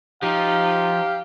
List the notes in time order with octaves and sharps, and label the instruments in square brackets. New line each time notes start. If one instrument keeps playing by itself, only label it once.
[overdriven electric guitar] F3 [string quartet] D#4 [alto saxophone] G4 [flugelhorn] F5